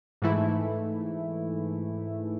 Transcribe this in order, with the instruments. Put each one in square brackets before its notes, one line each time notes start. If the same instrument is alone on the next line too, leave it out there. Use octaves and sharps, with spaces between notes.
[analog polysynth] G#2 E3 A3 E4